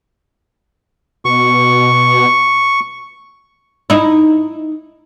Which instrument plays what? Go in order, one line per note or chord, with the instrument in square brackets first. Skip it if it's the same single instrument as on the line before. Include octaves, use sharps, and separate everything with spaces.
[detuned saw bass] B2 [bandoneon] C#6
[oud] D#4 E4